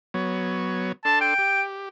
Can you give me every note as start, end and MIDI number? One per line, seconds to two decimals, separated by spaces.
0.14 0.92 54
0.14 0.92 59
0.14 0.92 73
1.05 1.34 62
1.05 1.34 69
1.05 1.21 81
1.05 1.34 84
1.21 1.63 79
1.38 1.89 67